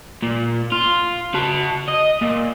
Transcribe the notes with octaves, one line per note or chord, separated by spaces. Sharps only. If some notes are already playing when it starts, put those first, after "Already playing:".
A#2
F4
F#4 A5
D#5
A#2